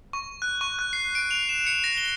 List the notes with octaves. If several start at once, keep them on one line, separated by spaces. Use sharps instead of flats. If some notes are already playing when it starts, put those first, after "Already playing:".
C#6
F#6
C#6
F#6
C7
D7
F7
E7
C#7
A#6
G7